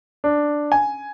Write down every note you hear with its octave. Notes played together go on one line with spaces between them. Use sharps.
D4
G#5